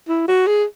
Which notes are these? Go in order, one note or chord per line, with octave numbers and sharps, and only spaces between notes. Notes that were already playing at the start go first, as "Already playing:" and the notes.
E4
F#4
G#4